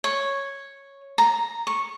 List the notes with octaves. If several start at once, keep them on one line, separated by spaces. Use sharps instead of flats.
C#5
A#5
C#6